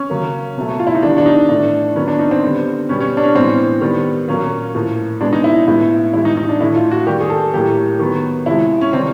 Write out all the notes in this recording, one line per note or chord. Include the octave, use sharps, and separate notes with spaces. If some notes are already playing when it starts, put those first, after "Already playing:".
Already playing: C#4
C#3 F#3 A#3
B2 F#3 A3
F4
E4
D#4
D#3 G3 B3 D4
D4
D#4
A2 E3 A3 D4
D#3 F#3 B3 C#4
D4
D#4
C4
D3 G3 B3
B2 G3 B3 C#4
C#4
D4
C#4
A2 E3 G#3 B3 C4
D#3 G3 B3
A#2 F#3 A#3 C#4
A2 F3 A#3
B2 G#3 B3 D4
D#4
E4
A2 F3 G#3 B3 E4
A2 E3 G#3 E4
D#4
D#4
D4
A2 E3 A3 E4
F4
F#4
D#3 G3 A#3 G4
G#4
A4
A2 F#3 A#3 G4
D#3 F#3 B3
C3 F3 G#3 E4
C#4
C3 E3 G3 C4